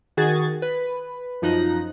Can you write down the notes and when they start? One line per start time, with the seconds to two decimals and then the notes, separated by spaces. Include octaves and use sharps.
0.17 D#3 F#4 G#4 G#6 A6
0.62 B4
1.42 F#2 F3 D#4 F#6 A#6